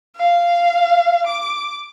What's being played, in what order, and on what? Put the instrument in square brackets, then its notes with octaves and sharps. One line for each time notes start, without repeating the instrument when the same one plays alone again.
[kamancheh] F5
D6